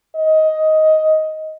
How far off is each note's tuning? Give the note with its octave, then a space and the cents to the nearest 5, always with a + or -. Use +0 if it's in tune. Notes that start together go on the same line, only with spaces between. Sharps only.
D#5 +10